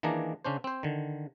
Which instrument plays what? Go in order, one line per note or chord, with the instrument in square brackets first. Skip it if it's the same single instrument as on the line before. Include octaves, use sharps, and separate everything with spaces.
[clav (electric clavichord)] D#3 E3 A#3 D4 G#4 A#5
C#3 C#4 D4 C5
C4 C5
D3 D#3